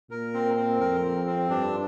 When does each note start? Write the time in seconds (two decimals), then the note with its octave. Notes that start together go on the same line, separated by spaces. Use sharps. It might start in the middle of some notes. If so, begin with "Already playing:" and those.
0.11 A#2 A#4
0.34 C4
0.57 C4
0.80 F2 A#4
1.04 C4
1.27 C4
1.50 G2 D4